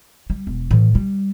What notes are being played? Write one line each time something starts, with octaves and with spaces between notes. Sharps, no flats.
G3
E1
A2 E3
G3